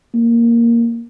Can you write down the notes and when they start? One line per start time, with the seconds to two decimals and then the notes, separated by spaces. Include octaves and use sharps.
0.14 A#3